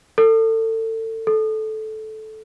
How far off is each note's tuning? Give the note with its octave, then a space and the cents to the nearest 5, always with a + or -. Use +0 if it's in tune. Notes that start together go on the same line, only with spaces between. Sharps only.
A4 +30
A4 -15